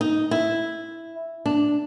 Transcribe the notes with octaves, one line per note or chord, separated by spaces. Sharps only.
D#4
E4
D4